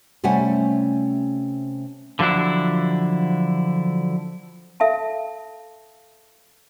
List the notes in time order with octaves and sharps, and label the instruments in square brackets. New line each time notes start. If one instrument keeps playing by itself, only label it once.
[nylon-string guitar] C3 G3 A3 C#4 F#5 G#5
[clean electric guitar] D3 F3 F#3 D4 E4
[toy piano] A4 E5 F5 A5